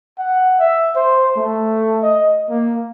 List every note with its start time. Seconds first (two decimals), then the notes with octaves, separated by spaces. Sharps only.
0.19 F#5
0.60 E5
0.96 C5
1.36 A3
2.03 D#5
2.50 A#3